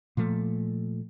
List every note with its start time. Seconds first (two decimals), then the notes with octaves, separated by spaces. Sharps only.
0.17 A#2 F3 A3